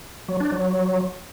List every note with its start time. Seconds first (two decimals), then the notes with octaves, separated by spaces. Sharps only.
0.28 F#3
0.40 D4
0.52 F#3